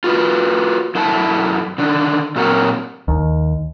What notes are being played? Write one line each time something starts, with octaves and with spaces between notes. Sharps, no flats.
F4 F#4 B4
F#2 E4 A4 E5 F#5 A5
D3 D#3 D4
A#2 F#3 C4 F#4 A#4 F#5
D#2